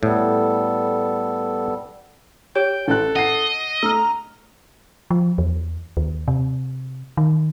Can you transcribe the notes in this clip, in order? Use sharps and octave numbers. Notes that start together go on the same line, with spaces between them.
A2 G3 B3 A4
G4 C#5 G5
A1 A4 F#6
D#5 F#5 C7
A3 A#5 E6 F6
F3
E2
D#2
C3
D#3